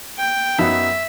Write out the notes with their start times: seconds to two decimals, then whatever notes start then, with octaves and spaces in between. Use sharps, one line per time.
0.18 G5
0.58 F#2 F#3 B3 D#4 E5